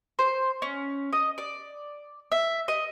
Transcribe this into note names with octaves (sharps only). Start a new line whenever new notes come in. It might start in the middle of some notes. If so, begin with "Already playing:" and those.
C5
C#4
D#5
D5
E5
D#5